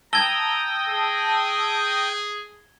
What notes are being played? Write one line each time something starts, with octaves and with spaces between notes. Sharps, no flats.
G5 A5 A#5 D#6 E6 G#6 A#6 G7
G#4